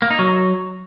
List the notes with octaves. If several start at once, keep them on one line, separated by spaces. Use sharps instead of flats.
A#3
D#4
F#3